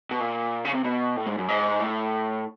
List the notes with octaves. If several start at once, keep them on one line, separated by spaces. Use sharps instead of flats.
B2
A#2
C#3
C3
B2
A2
G#2
F#2
G#2
A2